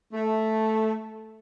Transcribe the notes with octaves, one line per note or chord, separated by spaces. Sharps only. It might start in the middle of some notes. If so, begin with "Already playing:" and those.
A3